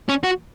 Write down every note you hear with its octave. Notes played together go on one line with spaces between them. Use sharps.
C#4
F#4